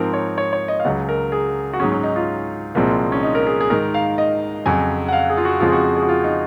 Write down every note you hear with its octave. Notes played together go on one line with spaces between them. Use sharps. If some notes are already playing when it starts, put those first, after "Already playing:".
Already playing: G#2 F3 C4 A#4
C#5
C#5
C#5
D#5
F5
C#2 C#3 F#3 F#5
A#4
G#4
F#4
G#2 F#3 C#4 G#4
C#4
D#4
F4
C2 A#2 F3 G#3 C4
C#4
D#4
A#4
G#4
G#4
G#2 D#3 G#3 A#4
F5
D#5
F2 C#3 F#3 G#5
F#5
F5
G#4
F4
F#4
F2 C#3 F3 G#3 C4 F4
G#4
F#4
G#4
F#4
F4
D#4